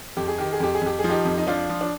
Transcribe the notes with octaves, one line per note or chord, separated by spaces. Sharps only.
F2 G4
G#4
D#3 G4
G#4
F2 G4
G#4
F2 G4
G#4
F3
D#4 G4
F2
D#4
F3 D4 F4
F3
D4